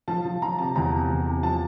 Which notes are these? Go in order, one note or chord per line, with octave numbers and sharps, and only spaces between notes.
F3 A5
F3
F3 A#5
C3 A5
E2 A#5
C3
E2
C3
F3 A5